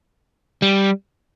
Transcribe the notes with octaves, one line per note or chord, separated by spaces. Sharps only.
G3